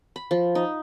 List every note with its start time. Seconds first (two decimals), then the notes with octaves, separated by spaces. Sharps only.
0.16 B5
0.31 F3
0.55 D#4